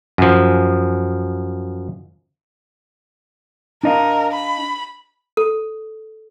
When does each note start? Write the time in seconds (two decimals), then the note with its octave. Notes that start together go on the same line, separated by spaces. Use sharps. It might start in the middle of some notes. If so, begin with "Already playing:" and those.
0.18 F#2 F3
3.83 D4 A#4 D#5 F5
4.34 B5
5.37 A4